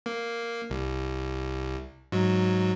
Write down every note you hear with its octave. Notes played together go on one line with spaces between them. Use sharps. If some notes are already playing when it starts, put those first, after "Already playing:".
A#3
C2
G#2 F#3